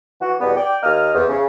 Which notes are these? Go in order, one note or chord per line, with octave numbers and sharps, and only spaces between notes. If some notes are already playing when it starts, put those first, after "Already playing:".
E3 F#4
E2 B2 G3 B3
D5 G5
D#2 A#3 D#5 F6
E2
C#3